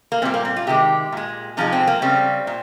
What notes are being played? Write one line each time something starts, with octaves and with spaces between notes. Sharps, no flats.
A#3
A#2 G3 C4
A#3
C4
F4
C3 D#3 G#3 G4
A#2 G#3
C3 F3 G#3 D#4
C4
A#3
C#3 G3 C4
A#2